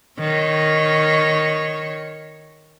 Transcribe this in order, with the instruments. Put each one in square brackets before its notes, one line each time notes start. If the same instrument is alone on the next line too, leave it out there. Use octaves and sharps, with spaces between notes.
[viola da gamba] D#3 C#5